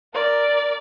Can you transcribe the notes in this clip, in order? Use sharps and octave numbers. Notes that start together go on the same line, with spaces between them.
A#4 D5